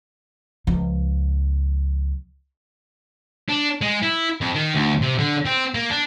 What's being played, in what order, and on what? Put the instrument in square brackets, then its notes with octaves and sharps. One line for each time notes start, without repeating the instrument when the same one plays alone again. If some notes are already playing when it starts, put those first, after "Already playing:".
[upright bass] C#2 F3
[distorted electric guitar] D4
G#3
E4
F2
D#3
D2
C3
D3
C4
A#3
D4